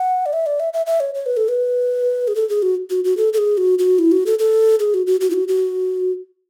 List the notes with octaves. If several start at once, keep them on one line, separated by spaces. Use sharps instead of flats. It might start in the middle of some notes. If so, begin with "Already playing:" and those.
Already playing: F#5
D5
E5
D5
E5
E5
E5
C#5
C#5
B4
A4
B4
G#4
A4
G#4
F#4
F#4
F#4
A4
A4
G#4
F#4
F#4
E4
F#4
A4
A4
G#4
F#4
F#4
F#4
E4
F#4
F#4